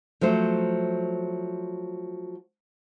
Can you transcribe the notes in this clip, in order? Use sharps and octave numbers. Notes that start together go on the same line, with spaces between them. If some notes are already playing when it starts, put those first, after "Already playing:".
F3 F#3 A3 C5